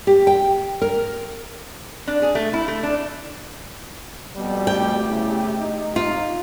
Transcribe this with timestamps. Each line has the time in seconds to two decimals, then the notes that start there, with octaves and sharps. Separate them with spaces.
0.07 G4
0.27 G5
0.82 A#4
2.07 D4
2.22 G#4
2.35 A3
2.53 E4
2.68 A3
2.83 D4
4.36 F2 B2 G3
4.67 A3 G4 G5
5.08 E2 C#3 E4
5.59 D#4
5.96 F4